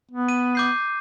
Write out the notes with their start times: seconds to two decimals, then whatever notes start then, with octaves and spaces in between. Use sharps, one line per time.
0.11 B3
0.29 D#7
0.55 D6 G6 C7